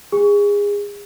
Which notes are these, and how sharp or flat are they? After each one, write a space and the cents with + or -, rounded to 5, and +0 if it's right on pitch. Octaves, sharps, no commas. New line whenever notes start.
G#4 -25